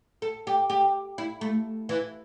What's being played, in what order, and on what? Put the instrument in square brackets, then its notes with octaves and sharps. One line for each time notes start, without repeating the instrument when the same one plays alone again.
[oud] A4
G4
G4
E4
A3
E3